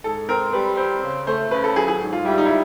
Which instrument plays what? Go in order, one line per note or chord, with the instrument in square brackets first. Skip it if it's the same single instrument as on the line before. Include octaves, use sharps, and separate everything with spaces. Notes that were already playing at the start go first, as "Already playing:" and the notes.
[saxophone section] G#2 [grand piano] A4
[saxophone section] C4 [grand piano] A#4
[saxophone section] G3 [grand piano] B4
[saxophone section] C4 [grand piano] C5
[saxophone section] C#3
[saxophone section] A3 [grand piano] C5
[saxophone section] C#3 [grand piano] B4
[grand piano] A4
[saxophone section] F#3 [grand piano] G#4
[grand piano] G#4
[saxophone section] G#2
[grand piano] F4
[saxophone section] G3 [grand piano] E4
[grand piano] D#4
E4